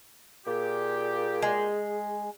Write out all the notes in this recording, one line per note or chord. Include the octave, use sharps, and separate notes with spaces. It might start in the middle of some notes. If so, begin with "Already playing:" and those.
A#2 G4 G#4
G#3